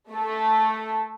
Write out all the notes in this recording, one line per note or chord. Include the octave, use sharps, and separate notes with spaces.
A3 A4